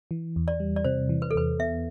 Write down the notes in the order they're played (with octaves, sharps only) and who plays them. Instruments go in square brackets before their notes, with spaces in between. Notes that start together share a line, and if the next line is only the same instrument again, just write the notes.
[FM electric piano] E3
E2
[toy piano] D5
[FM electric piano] G3
[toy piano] D5
[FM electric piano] C3 [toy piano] C5
[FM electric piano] E3
[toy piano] B4
A4
[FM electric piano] E2 [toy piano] B4
[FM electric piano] B3 [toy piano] E5